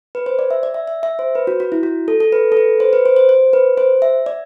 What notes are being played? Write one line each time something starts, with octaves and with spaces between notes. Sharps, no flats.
B4
C5
D5
E5
D5
E5
E5
E5
C5
B4
F#4
F#4
E4
F#4
A4
A4
B4
A4
B4
C5
B4
C5
C5
C5
B4
C5
E5
D5